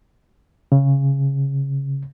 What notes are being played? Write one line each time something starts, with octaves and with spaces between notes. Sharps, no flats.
C#3